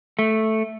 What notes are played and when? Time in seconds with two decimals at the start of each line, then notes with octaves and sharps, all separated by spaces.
0.19 A3